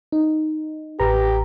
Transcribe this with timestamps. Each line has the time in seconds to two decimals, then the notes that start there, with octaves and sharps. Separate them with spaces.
0.12 D#4
1.00 A1 G4 B4 A#5